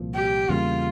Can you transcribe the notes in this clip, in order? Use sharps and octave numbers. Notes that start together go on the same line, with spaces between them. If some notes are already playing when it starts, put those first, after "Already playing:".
Already playing: C2 A#2 F3
G4
E2 C#3 G3 A#3 F4